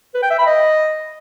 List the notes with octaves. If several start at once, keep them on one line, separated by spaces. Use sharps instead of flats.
B4
G5
E5
B5
D#5